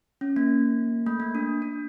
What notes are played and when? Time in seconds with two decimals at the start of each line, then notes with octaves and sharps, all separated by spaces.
0.21 C#4
0.36 A#3
1.06 A3
1.20 A#3
1.35 D4
1.62 D4